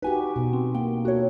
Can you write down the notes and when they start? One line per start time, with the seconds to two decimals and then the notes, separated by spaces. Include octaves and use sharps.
0.02 D#4 F#4 G4 B4 G#5
0.36 B2
0.53 C4
0.75 A#3 D4 G5
1.05 F4 F#4 A4 C#5